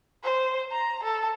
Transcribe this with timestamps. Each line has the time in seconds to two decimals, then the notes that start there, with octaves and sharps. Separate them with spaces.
0.23 C5
0.71 A#5
1.04 A4